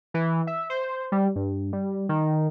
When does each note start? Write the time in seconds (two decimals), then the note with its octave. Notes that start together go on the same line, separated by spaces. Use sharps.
0.14 E3
0.47 E5
0.70 C5
1.12 G3
1.35 G2
1.73 G3
2.09 D#3